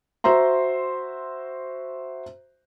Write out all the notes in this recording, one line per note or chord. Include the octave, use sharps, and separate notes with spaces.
F#4 C5 E5 A#5 C6